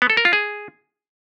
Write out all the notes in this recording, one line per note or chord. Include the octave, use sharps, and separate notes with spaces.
B3
A4
A#4
F4
G#4